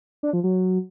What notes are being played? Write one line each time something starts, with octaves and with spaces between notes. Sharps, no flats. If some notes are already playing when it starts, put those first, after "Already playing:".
D4
F3
F#3